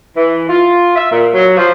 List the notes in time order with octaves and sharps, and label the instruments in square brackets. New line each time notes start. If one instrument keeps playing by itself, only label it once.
[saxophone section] E3
F4
E5
A#2
F#3
F3